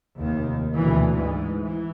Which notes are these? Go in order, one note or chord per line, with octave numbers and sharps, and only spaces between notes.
F1 D#2 D#3
D2 B2 E3
G#2 E3
E3